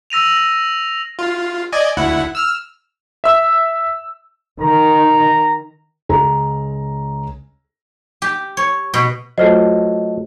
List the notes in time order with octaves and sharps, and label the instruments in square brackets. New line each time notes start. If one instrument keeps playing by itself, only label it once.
[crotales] E6 A#6 D#7 F7
A#6
[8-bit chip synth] F4
D5 D#5 G#5
D2 E4 F#5
E6 F6
[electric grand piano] E5 E6
[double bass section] D#3 [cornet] A#5
[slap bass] C#2 [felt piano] G#4 A#5
[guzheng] G4
C#5
B2
[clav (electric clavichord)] F#3 A4 [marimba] A3 F4 C5 [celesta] D#5